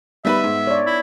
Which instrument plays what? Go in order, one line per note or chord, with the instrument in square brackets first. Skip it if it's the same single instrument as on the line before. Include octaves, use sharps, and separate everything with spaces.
[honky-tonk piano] G3 B4 B5 [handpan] B3 D#4 [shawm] E5
[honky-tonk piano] G#2
[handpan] C#5 D5
[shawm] E4